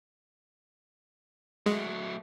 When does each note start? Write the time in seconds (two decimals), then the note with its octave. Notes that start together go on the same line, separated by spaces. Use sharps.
1.66 F#3 G#3 A3